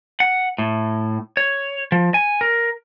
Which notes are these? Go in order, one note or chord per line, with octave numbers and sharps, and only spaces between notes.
F#5
A2
C#5
F3
G#5
A#4